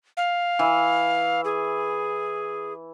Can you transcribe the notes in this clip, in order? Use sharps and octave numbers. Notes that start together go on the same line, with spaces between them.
F5
E3
G#4